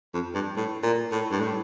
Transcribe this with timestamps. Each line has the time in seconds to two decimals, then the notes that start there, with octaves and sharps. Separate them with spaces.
0.14 F2
0.34 G2
0.56 A2
0.83 A#2
1.12 A2
1.31 G2
1.40 A2